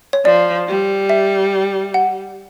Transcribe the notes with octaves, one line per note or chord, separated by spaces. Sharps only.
C#5
F3 D5
G3
E5
F#5